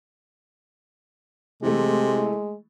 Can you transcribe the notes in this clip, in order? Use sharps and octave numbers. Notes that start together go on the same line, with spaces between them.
C3 E3 G#3 A3